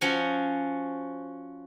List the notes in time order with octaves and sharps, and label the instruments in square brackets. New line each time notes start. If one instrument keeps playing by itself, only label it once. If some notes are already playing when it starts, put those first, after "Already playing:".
[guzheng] F3 C#4 F#4 C#5